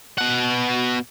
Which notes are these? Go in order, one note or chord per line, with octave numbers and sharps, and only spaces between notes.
B2 F#5